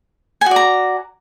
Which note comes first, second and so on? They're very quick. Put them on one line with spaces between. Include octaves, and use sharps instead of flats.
G#5 F#4 D5 A#5